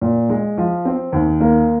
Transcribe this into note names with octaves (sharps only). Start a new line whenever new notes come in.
A#2
G#3
F3
C4
D#2
A#3